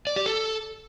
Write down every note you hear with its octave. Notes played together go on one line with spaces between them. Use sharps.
D5
G4
A4